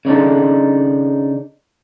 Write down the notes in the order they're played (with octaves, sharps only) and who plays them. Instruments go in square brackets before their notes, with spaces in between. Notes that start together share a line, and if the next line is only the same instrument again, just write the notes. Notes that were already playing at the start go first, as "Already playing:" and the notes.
[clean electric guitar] C#3 D4 D#4 A4